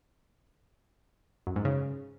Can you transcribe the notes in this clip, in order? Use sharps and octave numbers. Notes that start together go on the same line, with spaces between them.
F#2
G#2
C#3